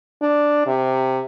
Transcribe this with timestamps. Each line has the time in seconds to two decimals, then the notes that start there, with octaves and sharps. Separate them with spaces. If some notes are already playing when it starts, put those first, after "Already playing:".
0.22 D4
0.67 C3